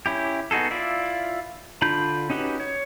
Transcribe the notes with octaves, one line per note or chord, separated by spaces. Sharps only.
C#4 E4 G4
B3 D#4 F#4 G#4 A4
E4 F4 D5 E5
D3 D4 F4 B5 G6
C#4 D#4 F#4 G4 B4
C#5